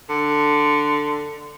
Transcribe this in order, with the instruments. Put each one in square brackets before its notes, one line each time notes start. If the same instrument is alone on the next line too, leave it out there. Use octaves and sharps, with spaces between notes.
[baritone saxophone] D3